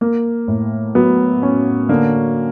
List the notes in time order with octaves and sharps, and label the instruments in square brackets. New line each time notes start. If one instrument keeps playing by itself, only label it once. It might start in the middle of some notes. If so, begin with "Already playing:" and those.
[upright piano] A#3
A2
[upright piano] F#3 [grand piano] B3
[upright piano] C#4
[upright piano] D3 [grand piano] A#3